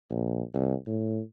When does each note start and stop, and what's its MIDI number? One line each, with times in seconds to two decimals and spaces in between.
0.10 0.42 34
0.54 0.74 36
0.86 1.21 45